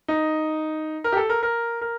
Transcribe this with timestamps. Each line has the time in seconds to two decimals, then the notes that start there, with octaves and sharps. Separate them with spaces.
0.08 D#4
1.04 A#4
1.12 G4
1.17 A4
1.29 A#4
1.43 A#4
1.81 A#4